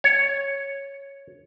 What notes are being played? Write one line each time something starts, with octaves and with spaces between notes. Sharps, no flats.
C#5